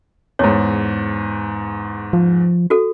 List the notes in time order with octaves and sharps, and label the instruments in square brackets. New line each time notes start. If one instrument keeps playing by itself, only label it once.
[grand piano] E2 G#2 [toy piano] C#5
[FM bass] F3
[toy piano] F#4 A4